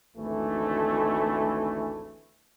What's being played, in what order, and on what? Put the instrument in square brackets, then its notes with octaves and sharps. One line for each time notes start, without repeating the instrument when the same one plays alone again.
[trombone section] G#1 D2 E3 A3